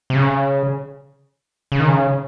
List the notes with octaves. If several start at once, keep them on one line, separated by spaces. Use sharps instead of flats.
C3
C#3
C#3
D#3
C#3